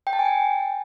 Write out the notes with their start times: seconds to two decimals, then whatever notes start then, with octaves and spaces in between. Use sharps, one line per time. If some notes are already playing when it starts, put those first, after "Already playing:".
0.07 G5
0.13 A5
0.19 G#5
0.25 G5